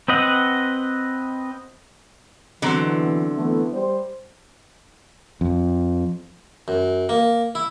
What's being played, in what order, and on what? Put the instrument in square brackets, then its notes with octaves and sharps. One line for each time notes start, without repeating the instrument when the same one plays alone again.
[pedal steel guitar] C4 B4 D#5 F#5
[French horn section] B2 E3 [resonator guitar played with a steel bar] D3 F#3 C4
[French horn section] E3 A3 B3
G3 C5
[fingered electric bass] F2
[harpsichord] F#2
A#3
E4